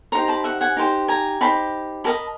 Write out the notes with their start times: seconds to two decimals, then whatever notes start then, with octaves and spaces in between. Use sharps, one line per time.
0.12 D#4 G4 C5 A#5 C6
0.28 A5 B5
0.44 E5 F#5
0.61 F#5 G#5
0.77 D#4 G4 C5
1.08 G#5 A#5
1.41 D#4 G4 C5 A5 B5
2.04 G4 A#4 D#5 A5 B5